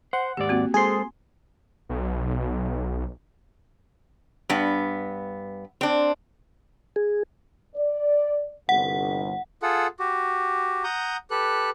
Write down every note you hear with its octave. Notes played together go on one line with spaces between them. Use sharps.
C5 F#5
D#2 G#2 G4 D5
A#3 C4 F#4
G#3 G#4 A4 C5 C6
B1
G2 B3
C4 D4
G#4
D5
G1 C2 F#5
F4 G#4 A4 F#5
F#4 G4
F#5 A#5 D#6 G6
G4 A4 B4 F#6